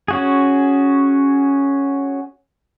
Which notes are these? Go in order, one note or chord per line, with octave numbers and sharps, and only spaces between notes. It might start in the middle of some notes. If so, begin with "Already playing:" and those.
C#4 F#4 G#4